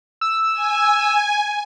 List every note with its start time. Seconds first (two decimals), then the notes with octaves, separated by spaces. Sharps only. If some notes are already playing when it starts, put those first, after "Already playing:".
0.21 E6
0.54 G#5